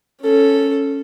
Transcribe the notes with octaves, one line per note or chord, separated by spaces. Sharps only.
C#4 A4